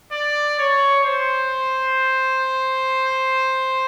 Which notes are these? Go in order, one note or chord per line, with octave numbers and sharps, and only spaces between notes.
D5
C#5
C5